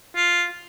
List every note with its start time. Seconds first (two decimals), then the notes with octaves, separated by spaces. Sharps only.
0.16 F4